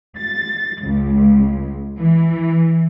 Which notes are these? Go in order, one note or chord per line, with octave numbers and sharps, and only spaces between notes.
A6
C#2
E3